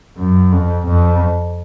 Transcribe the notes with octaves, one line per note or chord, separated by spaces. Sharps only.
F#2
F2
F2